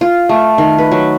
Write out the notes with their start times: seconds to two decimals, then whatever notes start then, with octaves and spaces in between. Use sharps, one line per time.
0.01 F4
0.29 A3
0.58 D#3
0.78 B4
0.92 F#3